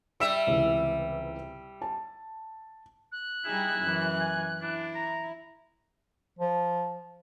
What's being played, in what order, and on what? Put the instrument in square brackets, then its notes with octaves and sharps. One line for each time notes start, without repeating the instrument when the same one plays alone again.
[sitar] G3 E5 [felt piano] E6 D7
[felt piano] C#2 C3 E3
A5
[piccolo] F#6
[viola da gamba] G3 D#4 G#4 [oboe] E4
[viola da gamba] F#2 E3
[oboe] G#5
[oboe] D4 [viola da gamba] E4
[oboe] A#5
[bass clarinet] F3